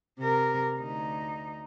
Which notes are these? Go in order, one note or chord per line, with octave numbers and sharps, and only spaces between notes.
C3 A#4
D2 D#4